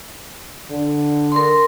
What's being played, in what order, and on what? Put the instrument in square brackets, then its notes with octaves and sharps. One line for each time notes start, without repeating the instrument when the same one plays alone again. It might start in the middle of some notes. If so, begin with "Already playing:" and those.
[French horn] D3
[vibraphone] A#4 C6